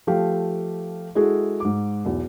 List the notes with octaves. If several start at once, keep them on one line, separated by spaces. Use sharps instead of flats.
F3 A3 G4 F5
G#3 E4 F#4 G#4 A4
G#2 D6
B1 E2